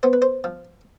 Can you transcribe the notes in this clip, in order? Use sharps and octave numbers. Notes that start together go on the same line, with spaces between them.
B3 C5
B4
C5
F3